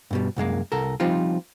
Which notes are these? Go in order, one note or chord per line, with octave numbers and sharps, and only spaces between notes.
G2 B2 G3
C2 F#2 G#3 A#3
C2 A4 A#4
F3 G3 C4 D#4 F4